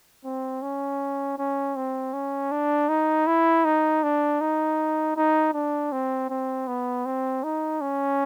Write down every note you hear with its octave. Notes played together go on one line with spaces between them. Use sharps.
C4
C#4
C#4
C4
C#4
D4
D#4
E4
D#4
D4
D#4
D#4
D4
C4
C4
B3
C4
D#4
C#4